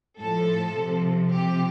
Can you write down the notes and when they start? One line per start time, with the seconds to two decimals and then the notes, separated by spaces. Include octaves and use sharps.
0.19 A2 F3 A4
0.75 C3 F3
1.32 C3 F3 G4